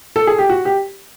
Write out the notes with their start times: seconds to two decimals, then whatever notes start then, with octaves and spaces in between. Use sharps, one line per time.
0.16 A4
0.27 G#4
0.38 G4
0.50 F#4
0.65 G4